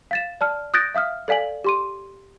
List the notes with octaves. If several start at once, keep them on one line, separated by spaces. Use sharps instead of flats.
F5 A6 E7
D5 A5 F6
D#6 F#6 G6 A6 A#6 D7
E5 F5 D#6 F6
A4 D5 F5 G#5 F#7
G4 C6 D#7